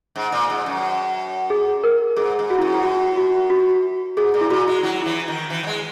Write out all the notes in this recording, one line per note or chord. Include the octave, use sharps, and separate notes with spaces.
G#2
A#2
G#2
F#2
G#4
A#4
G#2 G#4
G#2
F#4
F#2 E4
E4
F#4
F#4
F#4
G#2 G#4
A#2
E4
A#2 F#4
G#3
F#3 E4
E3 E4
D#3
E3
F#3
G#3